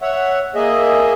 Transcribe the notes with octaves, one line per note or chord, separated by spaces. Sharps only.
C#5 E5 F#5
A#3 G#4 D#5 E5